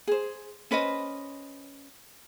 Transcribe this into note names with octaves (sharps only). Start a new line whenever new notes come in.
G#4 C5
C#4 B4 C5 D#5